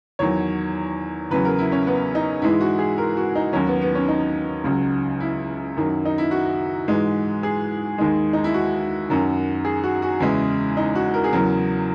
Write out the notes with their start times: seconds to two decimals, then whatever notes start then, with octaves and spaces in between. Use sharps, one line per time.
0.19 E2 D#3 F#3 C#5
1.30 E2 C#3 F#3 B4
1.45 A#4
1.58 E4
1.72 C#4
1.87 B3
2.15 D#4
2.42 G#2 E3 G#3 E4
2.61 F#4
2.79 G#4
2.98 A#4
3.17 F#4
3.35 D#4
3.53 D#2 D#3 F#3 C#4
3.67 B3
3.82 B3
3.95 C#4
4.08 D#4
4.64 C#2 C#3 F#3
5.20 E4
5.77 F#2 D#3 F#3
6.05 D#4
6.18 E4
6.31 F#4
6.88 G#2 E3 G#3
7.43 G#4
7.98 D#2 D#3 G#3
8.33 D#4
8.44 E4
8.54 F#4
9.10 F#2 D#3 F#3
9.65 G#4
9.84 F#4
10.02 F#4
10.20 E2 C#3 E3 G#3 E4
10.77 D#4
10.95 F#4
11.14 A#4
11.24 G#4
11.33 E2 C#3 F#3 A#4